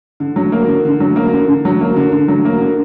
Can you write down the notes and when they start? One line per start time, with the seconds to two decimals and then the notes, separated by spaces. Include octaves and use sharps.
0.20 D3
0.36 F#3
0.52 A#3
0.68 D3
0.85 D3
1.00 F#3
1.16 A#3
1.33 D3
1.48 D3
1.65 F#3
1.81 A#3
1.96 D3
2.12 D3
2.28 F#3
2.45 A#3
2.61 D3